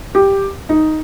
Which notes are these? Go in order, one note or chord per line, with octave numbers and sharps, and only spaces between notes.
G4
D#4